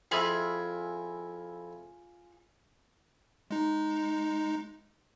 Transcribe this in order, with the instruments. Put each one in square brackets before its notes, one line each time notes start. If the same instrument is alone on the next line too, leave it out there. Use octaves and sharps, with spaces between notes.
[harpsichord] F2 E4 [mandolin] F4 G#4 B5
[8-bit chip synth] G#3 D#4